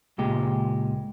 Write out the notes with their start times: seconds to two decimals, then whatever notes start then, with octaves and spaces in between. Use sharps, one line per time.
0.18 C#2 A#2 G#3 G4